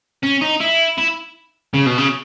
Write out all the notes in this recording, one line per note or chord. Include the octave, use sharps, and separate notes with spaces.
C#4
D#4
E4
E4
C#3
B2
C#3